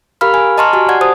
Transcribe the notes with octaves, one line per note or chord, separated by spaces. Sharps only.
G4 A#4 F5 B5 F6
G#5
D#5 A5 A#5 C6 C#6 F6
F#4 G4 G#5
D5 F#5 G#6
G4 C5 A5 D#6